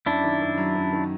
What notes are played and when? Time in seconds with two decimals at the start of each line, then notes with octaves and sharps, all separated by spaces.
0.06 F#2 D4 E4
0.24 D#3
0.42 F#2
0.58 F#3
0.75 F#2
0.93 D#3